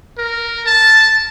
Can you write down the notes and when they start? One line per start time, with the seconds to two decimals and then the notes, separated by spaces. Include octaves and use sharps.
0.18 A#4
0.66 A5